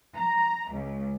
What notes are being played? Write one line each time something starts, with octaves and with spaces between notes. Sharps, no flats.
A#5
C#2